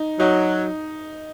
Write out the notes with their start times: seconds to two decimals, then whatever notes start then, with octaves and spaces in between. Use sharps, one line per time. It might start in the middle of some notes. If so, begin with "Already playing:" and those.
Already playing: D#4
0.19 F#3 D#4